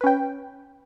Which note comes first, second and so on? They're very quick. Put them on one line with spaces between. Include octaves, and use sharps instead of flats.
B4 C#4 G5